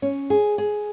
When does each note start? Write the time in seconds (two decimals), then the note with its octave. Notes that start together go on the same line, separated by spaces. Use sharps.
0.02 C#4
0.30 G#4
0.58 G#4